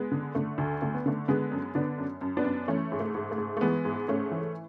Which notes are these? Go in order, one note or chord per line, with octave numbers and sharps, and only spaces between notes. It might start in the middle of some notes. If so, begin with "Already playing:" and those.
Already playing: G#3 B3
D3
D3 A3
D2
D3 A3
B3
D3 A3
D3 G#3 B3
F#2
D3 B3 D4
F#2
F#2
B3 D4
F#2
E3 A3 C#4
G#2
A3
G#2
A3
G#2
A3
E3 G#3 B3
G#2
G#2 A3 C#4
E3